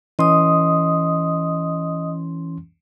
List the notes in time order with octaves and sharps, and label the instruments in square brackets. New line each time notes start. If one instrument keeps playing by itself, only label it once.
[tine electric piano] E3 C#4 C6 [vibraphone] D#5 D#6